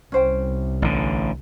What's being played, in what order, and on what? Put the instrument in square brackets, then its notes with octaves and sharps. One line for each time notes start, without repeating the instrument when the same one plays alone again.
[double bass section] C2 [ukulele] C#4 C5 G5
[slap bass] A1 D3